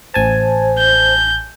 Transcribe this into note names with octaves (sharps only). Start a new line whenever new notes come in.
A1 C5 G#5 A5
G6